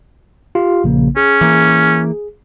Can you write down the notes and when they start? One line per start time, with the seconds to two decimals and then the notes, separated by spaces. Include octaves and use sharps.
0.55 F4 G4 F5
0.84 A#1 C#3 A#3
1.17 C#4 G#4
1.41 E3 A#3